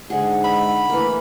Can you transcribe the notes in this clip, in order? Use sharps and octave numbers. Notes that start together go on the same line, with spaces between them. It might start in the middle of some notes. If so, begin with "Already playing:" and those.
G#2 D3 G#4 F#5
E5 B5
E3 A3 A#3